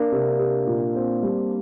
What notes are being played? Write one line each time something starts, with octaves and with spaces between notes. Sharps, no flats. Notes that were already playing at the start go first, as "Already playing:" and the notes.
Already playing: A#3 D4
C3
G4
A#2
C4
G3